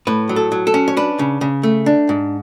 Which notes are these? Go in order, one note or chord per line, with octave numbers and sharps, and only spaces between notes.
A2 B4
F#3
A4
F#3
A4
C#4
C#5
D4 B4
C#3
C#3
A3
D4
G#2